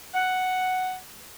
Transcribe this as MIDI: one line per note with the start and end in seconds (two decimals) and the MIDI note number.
0.14 0.95 78